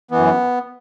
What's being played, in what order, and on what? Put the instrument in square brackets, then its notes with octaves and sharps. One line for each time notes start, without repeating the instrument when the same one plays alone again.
[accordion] F#2 E3 B3